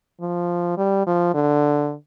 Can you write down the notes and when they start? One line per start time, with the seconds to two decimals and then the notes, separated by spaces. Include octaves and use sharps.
0.21 F3
0.78 G3
1.07 F3
1.34 D3